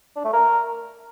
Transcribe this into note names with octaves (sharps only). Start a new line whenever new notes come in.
D4
A3
A#4